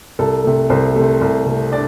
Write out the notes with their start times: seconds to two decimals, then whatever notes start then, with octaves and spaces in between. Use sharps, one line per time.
0.19 C2 A4
0.44 C3 A3
0.70 C2 C5
0.96 C3 A3
1.21 C2
1.46 C3 A3
1.72 D4 D5